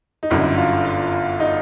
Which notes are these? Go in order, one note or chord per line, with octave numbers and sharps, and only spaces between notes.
D#4
G1 F#2 D3 E4
F4
F4
D#4